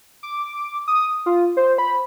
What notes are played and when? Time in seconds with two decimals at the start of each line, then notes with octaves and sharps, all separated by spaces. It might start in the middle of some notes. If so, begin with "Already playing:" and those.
0.23 D6
0.88 D#6
1.26 F4
1.57 C5
1.78 B5